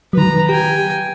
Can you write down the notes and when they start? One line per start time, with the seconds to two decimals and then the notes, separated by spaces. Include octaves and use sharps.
0.13 D#3 F#3 B4 A#5
0.49 G4 G5 G#5